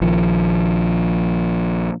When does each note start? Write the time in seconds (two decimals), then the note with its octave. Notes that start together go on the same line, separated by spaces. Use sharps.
0.01 A#1 D#3 F3